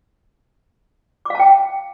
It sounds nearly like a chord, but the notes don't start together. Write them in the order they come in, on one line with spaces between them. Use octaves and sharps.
D6 F5 A5 G5